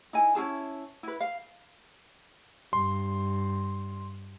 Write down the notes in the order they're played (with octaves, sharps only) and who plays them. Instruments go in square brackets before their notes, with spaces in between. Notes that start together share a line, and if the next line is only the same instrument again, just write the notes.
[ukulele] D#4 E4 G#5
C#4 E4 G#4 A5
E4 B4
F5
[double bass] G2 [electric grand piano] C6